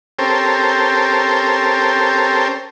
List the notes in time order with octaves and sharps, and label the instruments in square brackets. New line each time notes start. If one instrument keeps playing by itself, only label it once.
[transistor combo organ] C4 C#4 G4 A4 A#4 C5